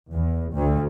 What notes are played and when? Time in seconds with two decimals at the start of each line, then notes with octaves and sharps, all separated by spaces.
0.12 E2
0.55 D2